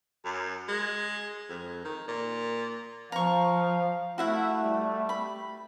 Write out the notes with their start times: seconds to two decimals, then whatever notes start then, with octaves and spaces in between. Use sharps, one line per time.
0.25 F#2
0.68 G#3
1.49 F2
1.84 D#3
2.08 A#2
3.12 F3 F5 A#5 C#6
4.18 A3 E4 F#4 E5 F#5
4.62 G3
5.09 B5